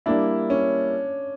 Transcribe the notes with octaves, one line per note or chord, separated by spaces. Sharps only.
G3 A#3 D4 E4
C#4